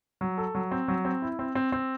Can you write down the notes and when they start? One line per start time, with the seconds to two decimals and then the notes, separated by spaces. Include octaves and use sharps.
0.21 F#3
0.38 A4
0.55 F#3
0.71 C4
0.88 F#3
1.05 C4
1.22 E4
1.39 C4
1.55 C4
1.72 C4